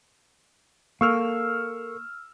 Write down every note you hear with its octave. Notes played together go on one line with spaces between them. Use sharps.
A#3 A4 A#4 F5 C#6 E6 F6